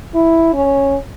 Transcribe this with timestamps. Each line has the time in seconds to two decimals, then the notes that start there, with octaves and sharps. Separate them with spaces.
0.15 E4
0.54 C#4